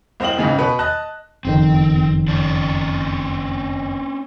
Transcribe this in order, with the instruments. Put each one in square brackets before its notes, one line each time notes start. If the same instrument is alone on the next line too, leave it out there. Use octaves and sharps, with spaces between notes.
[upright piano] C2 C5 D#5 F5 G5 F#7
C#2 G#2 C#3
B2 B4
D#5 A5 F#6
[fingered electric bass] F#1 F2 D#3 [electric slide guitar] C4
[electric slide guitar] C4 C#4 D5